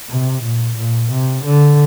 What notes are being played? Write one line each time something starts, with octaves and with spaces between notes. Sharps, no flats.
C3
A#2
A#2
C3
D3